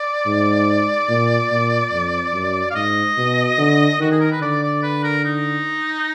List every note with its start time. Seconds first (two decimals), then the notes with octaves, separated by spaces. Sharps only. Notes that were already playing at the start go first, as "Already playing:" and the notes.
Already playing: D5
0.26 G#2
1.09 A#2
1.51 A#2
1.92 F2
2.33 F#2
2.70 F5
2.75 G#2 D#5
3.17 B2
3.58 D3
4.00 D#3 F#4
4.11 G#4
4.20 A#4
4.31 B4
4.41 D3 D5
4.63 D5
4.83 B4
5.03 A#4
5.25 D#4